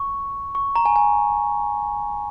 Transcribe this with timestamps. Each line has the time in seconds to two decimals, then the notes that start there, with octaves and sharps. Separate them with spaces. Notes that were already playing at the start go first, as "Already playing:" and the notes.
Already playing: C#6
0.55 C#6
0.76 A#5
0.85 G#5
0.96 G#5